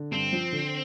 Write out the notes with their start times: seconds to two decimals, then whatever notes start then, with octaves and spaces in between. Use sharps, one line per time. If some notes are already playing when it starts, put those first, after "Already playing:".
Already playing: D3
0.12 G2 C4
0.33 F3
0.52 D3